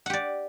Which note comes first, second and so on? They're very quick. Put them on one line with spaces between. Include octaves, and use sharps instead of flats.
F#5 G4 D5